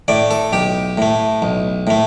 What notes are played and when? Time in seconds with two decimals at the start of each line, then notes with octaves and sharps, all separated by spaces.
0.08 A2 A3 D5
0.31 A4
0.53 B1 G4
0.97 A2 A3
1.42 B1
1.87 A2 A3